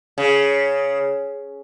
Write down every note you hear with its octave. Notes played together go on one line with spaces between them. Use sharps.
C#3